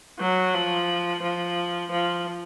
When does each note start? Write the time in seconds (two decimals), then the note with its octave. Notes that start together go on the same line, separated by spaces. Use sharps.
0.19 F#3
0.54 F3
1.22 F3
1.91 F3